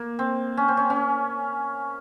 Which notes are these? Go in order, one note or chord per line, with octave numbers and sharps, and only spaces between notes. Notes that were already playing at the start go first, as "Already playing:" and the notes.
Already playing: A#3
C4
C#4
C4
C#4
C#4